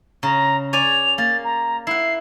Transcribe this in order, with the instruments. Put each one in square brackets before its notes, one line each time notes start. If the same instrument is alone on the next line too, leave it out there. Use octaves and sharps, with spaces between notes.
[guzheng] C#3 [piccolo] A#5
[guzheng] C#5 D5 G#5 [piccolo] F7
[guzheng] A#3 [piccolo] A6
[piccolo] A#5
[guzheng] E4 F#5 [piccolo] C7